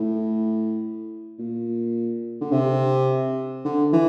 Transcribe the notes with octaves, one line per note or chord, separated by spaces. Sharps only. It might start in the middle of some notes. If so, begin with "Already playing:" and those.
Already playing: A2
A#2
D3
C3
D3
E3